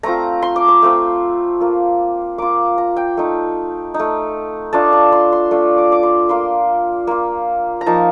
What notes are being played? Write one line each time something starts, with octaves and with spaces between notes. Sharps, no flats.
A3 C4 F4 A#5
C6
D6
C6
A3 C4 F4
A#3 F4
A#3 F4 D6
A#5
G5
A3 D#4
D#4
A3
A3 D4 F4 A5
A5
C6
C6
A3 D4 F4
D6
D6
C6
A#3 F4 C6
A#3 F4
A#5
F3 A#3 D#4 A5